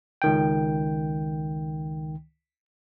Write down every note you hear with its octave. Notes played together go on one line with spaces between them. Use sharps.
C#2 D#3 G5